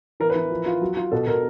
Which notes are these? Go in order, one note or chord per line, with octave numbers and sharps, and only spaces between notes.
E3 A#4
B4
E3
F3
F4
F#3
F4
B2 A4
B2 A#4